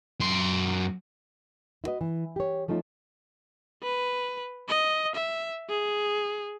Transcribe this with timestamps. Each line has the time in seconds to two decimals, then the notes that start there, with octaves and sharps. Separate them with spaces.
0.20 F#2 C6
1.84 E4 F#4 B4 D#5
2.01 E3
2.36 G4 C#5
2.68 F3 A3 C#4 D#4 F4
3.83 B4
4.68 D#5
5.15 E5
5.70 G#4